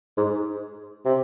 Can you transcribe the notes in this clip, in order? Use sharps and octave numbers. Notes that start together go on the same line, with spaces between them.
G#2
C3